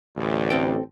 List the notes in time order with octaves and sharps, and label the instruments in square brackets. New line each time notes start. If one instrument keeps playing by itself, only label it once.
[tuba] A1 [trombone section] D2
[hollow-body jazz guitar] C4 A4 G5